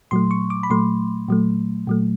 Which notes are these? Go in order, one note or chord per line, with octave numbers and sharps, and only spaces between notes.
A#2 F#3 A3 C6
C#6
D6
B5
A#2 F#3 A3 C6
A#2 F#3 A3
A#2 F#3 A3